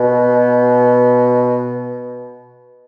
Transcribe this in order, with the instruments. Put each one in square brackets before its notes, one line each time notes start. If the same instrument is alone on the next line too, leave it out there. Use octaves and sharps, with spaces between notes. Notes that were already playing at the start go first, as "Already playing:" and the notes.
Already playing: [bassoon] B2